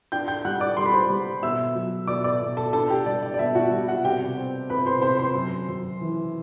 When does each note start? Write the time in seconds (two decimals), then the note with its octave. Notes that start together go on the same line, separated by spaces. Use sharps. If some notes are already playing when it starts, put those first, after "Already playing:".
0.12 D4 G5 G6
0.28 G5 G6
0.45 G3 F#5 F#6
0.60 D5 D6
0.77 G3 C6
0.85 B5
0.93 C5 C6
1.10 G3
1.42 B2 E5 E6
1.75 F#3
2.07 B2 D5 D6
2.24 D5 D6
2.41 B2
2.57 A4 A5
2.73 D4 A4 A5
2.90 G4 G5
3.06 G3 D5
3.23 D5
3.34 D5
3.39 B2 E5
3.55 F#4 F#5
3.71 G3 E5
3.88 F#4 F#5
4.04 C3 G4 G5
4.37 C4
4.69 C3 B4 B5
4.86 C5 C6
5.02 C3 C5 C6
5.18 C5 C6
5.35 F#2
5.68 F#2
6.01 E3